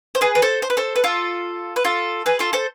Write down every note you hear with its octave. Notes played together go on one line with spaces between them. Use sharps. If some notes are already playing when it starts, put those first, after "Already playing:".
C5
G#4 B4
B4
A4 C5
C5
B4
A4 C5
B4
F4 A4
B4
F4 A4
G#4 B4
F4 A4
A4 C5